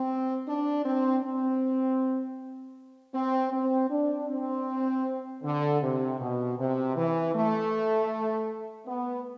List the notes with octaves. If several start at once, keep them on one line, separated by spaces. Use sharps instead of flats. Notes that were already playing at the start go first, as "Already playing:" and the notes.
Already playing: C4
D4
C4
C4
C4
C4
D4
C4
D3
C3
B2
C3
E3
A3
B3